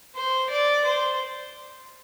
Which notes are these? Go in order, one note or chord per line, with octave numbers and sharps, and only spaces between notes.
C5
D5
C5